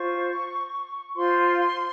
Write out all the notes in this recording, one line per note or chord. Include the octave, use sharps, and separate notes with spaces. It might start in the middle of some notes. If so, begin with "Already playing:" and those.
Already playing: F4 C5 C#6
F4 C5 C6